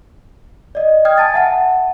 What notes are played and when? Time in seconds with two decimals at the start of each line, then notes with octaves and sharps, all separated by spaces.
0.75 D5 D#5
1.05 G5 D#6 F6 G#6
1.18 G#5 A5 A6
1.34 E5 F#5 A5